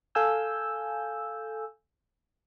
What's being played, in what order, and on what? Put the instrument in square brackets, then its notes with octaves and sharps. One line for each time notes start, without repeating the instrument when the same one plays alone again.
[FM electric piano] A4 F5 G#5 E6 G6